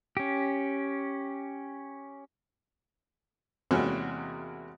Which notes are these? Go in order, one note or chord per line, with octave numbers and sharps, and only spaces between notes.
C#4 G4
E2 C3 G#3 A#3 C#4 F#4